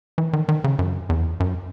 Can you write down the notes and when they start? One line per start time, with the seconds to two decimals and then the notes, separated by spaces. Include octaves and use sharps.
0.18 E3
0.33 D#3
0.49 D#3
0.64 C#3
0.79 F#2
1.09 E2
1.40 F#2